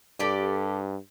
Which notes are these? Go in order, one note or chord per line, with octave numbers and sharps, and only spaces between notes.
G2 G4 A4 D5